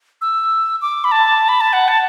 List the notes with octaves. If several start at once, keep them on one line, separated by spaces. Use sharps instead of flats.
E6
D6
B5
A5
B5
A5
F#5
A5